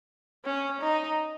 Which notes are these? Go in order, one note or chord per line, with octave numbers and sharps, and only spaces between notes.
C#4
D#4